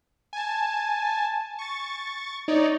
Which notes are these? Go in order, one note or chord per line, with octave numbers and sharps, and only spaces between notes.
G#5 A5
C#6 A6
D#4 C#5 D5